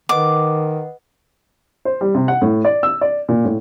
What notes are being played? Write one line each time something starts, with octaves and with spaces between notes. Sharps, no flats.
D#3 B4 D#5 F#5 D6
C5
G3
C3
F#5
A2
D5
E6
D5
A#2
A2